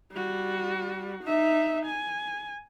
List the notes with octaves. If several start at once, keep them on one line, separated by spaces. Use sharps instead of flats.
G3 F#4
D#4 E5
G#5